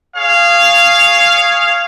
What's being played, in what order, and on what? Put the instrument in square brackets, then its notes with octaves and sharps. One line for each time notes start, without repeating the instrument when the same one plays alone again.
[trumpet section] G#4 C#5 F5